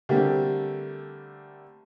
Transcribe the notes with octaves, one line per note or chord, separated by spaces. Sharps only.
D3 G3 A3 A#3 C4 G4